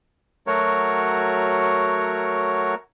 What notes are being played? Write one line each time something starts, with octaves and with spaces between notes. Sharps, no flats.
F#3 A3 F#4 A#4 C#5